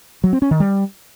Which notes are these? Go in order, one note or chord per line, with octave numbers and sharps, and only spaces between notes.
F#3
C4
C#4
D#3
G3